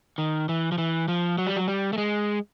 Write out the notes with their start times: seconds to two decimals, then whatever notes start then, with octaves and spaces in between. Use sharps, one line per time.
0.18 D#3
0.49 E3
0.72 F3
0.78 E3
1.08 F3
1.38 F#3
1.47 G3
1.57 F#3
1.68 G3
1.93 A3
1.98 G#3